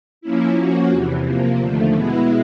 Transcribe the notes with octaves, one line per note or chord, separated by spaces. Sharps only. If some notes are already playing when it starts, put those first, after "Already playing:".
F3 A#3 C#4 E4
F3 A#3 C#4 F#4
E2 C3 E3
C3 F3 A#3
D#2 D3 F3 A3
B2 G#3 B3 E4